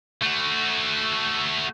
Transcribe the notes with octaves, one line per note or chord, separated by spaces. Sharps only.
A3 F#4